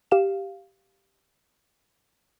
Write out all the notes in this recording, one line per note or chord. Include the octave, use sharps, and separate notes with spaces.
G4 F5 E7